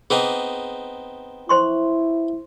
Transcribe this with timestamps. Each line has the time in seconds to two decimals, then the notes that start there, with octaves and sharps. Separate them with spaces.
0.10 B3 C4 D#4 G#4
1.49 E4 C5 C6 C#6